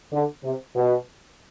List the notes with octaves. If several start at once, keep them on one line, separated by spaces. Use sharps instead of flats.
D3
C3
B2